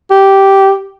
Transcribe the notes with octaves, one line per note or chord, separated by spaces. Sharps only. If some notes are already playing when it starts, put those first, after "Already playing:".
G4